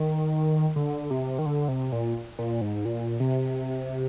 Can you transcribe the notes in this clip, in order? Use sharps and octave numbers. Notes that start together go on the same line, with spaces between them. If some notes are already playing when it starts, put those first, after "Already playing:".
Already playing: D#3
D3
C3
D#3
D3
C3
A#2
A#2
G#2
A#2
C3